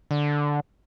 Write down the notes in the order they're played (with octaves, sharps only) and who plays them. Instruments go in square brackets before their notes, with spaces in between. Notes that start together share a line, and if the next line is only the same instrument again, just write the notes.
[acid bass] D3